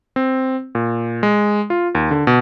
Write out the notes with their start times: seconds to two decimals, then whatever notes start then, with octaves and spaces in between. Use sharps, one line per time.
0.16 C4
0.75 A#2
1.23 G#3
1.70 F4
1.95 D#2
2.11 D3
2.27 B2